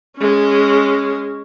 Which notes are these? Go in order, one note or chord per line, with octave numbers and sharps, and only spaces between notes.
G#3 C#4